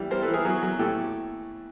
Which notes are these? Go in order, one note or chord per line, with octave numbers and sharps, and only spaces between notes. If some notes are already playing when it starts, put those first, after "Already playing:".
Already playing: E3 G3
G3 A#4 C5
A4 B4
E3
G#4 A#4
F#3 F#4 G#4
F#3
A2 G4 A4